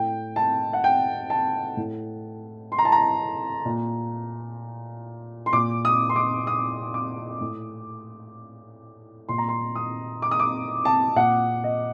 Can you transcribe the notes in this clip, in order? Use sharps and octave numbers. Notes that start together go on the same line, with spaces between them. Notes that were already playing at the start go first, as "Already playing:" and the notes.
Already playing: A2 G5
A5
F#5
G5
A5
A2
C6
A#5
A5
A#5
A#2
C6
A#2 D6
D#6
C6
D6
D#6
D6
A2
A#2 C6
A#5
C6
D#6
D6
D#6
D6
A5
A#2 F#5
D#5